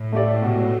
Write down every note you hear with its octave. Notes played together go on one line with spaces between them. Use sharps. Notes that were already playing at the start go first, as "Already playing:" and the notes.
Already playing: A2
A3 G4 D5
B2